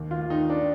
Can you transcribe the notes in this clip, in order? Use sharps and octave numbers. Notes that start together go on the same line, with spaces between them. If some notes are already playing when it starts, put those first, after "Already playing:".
Already playing: D#2
F4
D#3 D#4
D4